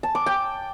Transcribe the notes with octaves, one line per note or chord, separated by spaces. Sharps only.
A5
D6
G5